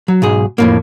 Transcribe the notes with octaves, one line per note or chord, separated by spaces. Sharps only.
F#3
B1 G#2 G#4
F2 A2 A#3